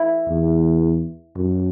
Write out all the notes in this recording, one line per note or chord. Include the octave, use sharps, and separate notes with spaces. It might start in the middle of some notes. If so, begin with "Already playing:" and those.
Already playing: E4
E2
F#2